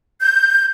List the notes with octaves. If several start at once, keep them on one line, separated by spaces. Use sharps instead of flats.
G6